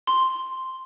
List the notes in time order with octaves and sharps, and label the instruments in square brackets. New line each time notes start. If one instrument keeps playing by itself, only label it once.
[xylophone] C6